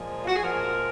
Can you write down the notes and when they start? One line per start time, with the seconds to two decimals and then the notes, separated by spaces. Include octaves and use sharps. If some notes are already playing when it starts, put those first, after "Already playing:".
Already playing: A#2 F3 G#3
0.20 F4
0.28 F#4
0.35 G#4
0.43 A#2 F3 G#3 A#4